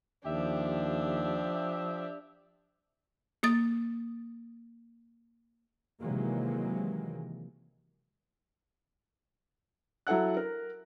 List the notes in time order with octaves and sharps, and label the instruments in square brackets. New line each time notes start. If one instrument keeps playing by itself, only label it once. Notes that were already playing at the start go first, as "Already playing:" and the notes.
[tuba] D#2 [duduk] F3 [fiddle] D4 [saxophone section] G4 E5
[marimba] A#3 D#6 A6
[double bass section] C3 D#3 E3 F#3 G#3 A#3
[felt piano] F#3 E4 A4 F#5 F#6
A#4